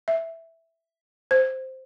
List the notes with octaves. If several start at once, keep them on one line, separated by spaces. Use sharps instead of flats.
E5
C5